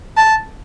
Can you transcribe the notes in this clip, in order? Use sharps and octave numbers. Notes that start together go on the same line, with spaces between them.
A5